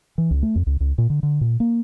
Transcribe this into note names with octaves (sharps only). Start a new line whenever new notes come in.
E3
C#2
A3
F2
C#2
C#2
A#2
D3
D3
A#2
A#3